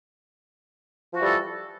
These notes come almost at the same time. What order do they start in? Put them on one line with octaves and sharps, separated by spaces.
F3 F#4 E3 G3 A4